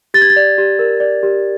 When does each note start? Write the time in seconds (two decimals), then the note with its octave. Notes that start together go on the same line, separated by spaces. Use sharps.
0.14 G4 A6
0.22 G#6
0.30 A6
0.36 D5
0.58 G4
0.79 A#4
1.00 D5
1.23 G4